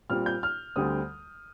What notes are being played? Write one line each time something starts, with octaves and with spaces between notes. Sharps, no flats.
A#2 G3 C4 F6
G6
F6
D2 D3 G3 C4 D#6